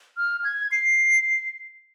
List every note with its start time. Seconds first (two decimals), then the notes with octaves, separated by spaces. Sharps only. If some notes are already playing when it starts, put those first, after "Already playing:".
0.17 F6
0.44 G#6
0.72 C7